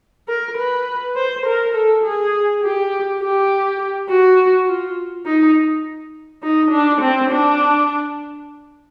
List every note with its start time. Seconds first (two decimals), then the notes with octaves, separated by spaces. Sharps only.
0.28 A#4
0.58 B4
1.16 C5
1.46 A#4
1.74 A4
2.04 G#4
2.62 G4
3.20 G4
4.09 F#4
4.67 F4
5.26 D#4
6.43 D#4
6.71 D4
7.01 C4
7.30 D4